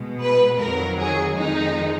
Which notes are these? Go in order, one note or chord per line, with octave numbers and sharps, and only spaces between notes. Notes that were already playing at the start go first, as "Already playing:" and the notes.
Already playing: B2 G#3
B4
F2 D#3 F#3 A#4
G#4
F2 D#3 G#3 D#4